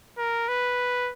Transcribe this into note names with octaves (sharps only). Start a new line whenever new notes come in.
A#4
B4